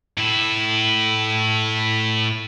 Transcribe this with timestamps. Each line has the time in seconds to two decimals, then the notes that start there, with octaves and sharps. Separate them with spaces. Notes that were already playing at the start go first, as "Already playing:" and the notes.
0.18 A2 E4